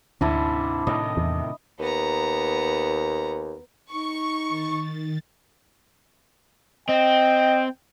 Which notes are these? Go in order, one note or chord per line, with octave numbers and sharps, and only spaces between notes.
D2 G#2 C3 D4 E4
A2 C3 D#3 D#5
E2
D#2 B3 A#5
D#4 C#6
D#3 A6
C4 D#5 G5